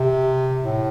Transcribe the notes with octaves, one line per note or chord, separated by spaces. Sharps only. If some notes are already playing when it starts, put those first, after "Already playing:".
Already playing: C3
A2